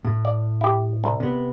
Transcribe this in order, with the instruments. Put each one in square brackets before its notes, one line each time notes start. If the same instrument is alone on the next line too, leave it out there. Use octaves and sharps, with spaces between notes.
[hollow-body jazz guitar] A2
[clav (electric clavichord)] D5
E4 G4
C2
[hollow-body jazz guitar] C3 B3